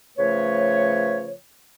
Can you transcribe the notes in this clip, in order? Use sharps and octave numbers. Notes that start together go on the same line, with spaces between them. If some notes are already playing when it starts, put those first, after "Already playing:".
C#3 F3 A3 B4 C#5